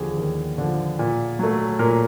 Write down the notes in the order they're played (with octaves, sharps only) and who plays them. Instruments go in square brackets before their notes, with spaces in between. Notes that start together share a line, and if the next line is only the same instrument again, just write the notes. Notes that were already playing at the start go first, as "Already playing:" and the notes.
Already playing: [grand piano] D#2 D3 F3 G4 G#4
D#2
D3 F3
A#2
F#3 A3
A#2 A#4